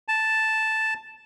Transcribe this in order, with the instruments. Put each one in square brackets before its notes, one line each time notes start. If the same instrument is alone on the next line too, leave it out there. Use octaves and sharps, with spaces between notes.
[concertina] A5